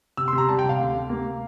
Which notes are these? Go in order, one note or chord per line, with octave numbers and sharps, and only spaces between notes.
C3 E6
C3 C6
A#5
G3 A5
G5
C3
F5
D2
C3
A#3